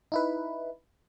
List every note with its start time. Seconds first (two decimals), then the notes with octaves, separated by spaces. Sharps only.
0.12 D#4 E4 B4